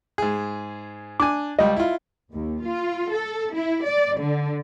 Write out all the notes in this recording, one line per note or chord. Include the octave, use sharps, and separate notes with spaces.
G#2 G#4
D4 G#5 D6
C#2 G3 D#5
E4 F4
D#2
F4
A4
E4
D5
D3